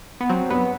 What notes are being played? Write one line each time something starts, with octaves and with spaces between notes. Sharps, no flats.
B3
F#3 C4
G2 B3